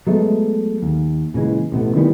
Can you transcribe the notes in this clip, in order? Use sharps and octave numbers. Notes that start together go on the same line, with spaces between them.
F#3 G#3 A3 B3
D#2
A#2 C#3 E3 G#3
A1 B2 A3 B3
D#3 E3 G3 B3